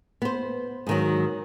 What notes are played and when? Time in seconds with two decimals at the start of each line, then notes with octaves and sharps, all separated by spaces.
0.22 B3 C5
0.87 G#2 D#3 F#3